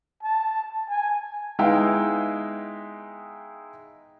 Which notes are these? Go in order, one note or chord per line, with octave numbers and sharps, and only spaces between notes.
A5
G#5
G#3 B3 D#4 E4 F5 G5